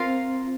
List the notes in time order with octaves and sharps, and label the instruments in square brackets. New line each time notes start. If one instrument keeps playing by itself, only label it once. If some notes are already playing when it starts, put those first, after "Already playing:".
Already playing: [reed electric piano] C4 [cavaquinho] F4 A#4 F5 C6